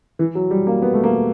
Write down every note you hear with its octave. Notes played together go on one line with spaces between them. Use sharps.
E3
F#3
G3
A#3
B3
A3
A#3